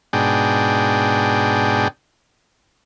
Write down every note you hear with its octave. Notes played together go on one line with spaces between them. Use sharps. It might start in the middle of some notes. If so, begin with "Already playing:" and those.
G#2 B2 D4 G#4 G5